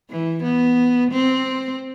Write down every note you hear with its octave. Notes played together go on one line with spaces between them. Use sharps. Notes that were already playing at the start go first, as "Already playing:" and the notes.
E3
B3
C4